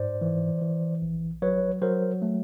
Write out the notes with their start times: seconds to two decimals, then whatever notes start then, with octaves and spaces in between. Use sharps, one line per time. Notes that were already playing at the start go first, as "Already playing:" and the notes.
Already playing: G#2 C5 D5
0.21 E3
0.62 E3
1.02 A#1
1.42 F#3 B4 C#5
1.82 F#3 A#4 C5
2.22 A3